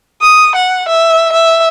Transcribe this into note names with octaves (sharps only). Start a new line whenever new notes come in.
D#6
F#5
E5
E5